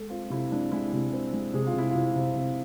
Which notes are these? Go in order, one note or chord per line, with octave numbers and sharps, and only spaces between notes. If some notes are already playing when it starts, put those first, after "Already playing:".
Already playing: G#3 A4
C4 F4
C3 E4
G#3 D4
G#3 E4
C3
C4
G#3
C3 G#4
F4
C3 E4
C3 F4
C3
C3